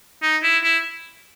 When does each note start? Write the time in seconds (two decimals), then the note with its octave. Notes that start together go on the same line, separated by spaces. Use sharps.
0.22 D#4
0.43 E4
0.64 E4